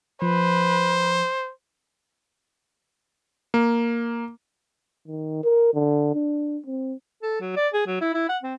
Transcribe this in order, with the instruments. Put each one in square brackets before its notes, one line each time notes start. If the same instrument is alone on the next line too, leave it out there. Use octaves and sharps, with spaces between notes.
[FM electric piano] F3 [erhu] B4 [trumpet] C5
[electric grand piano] A#3
[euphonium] D#3
A#4
D3
D4
C4
[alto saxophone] A4
F#3
D5
G#4
F#3
E4
E4
F#5
C4